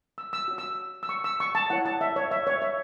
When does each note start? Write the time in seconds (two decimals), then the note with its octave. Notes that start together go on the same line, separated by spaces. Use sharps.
0.18 E6
0.33 E6
0.48 F#4 C#5
0.58 E6
1.03 E6
1.09 C#6
1.24 E6
1.40 C#6
1.55 A5
1.70 E4 C#5 F#5
1.86 A5
2.01 E5
2.16 C#5
2.31 E5
2.47 C#5
2.62 E5